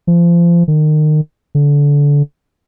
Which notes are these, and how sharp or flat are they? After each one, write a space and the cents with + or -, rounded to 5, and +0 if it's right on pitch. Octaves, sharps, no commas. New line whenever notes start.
F3 -30
D#3 -30
D3 -25